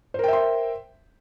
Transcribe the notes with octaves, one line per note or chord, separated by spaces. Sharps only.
A#4 C5 E5 G5 C6